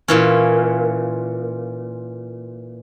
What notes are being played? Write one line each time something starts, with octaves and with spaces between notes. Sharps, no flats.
A#2 E3 C#4